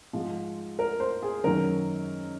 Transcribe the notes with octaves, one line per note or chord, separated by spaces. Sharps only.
G#2 F3 G#3
A#4
C5
G#4
F#2 D#3 F#3 A#4